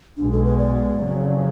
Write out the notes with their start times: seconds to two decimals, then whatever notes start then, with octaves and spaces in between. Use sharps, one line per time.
0.17 B1 B2 G#3 D4
0.32 A4
0.45 B4
0.58 D5
1.00 F#1 F2 C#3 F#3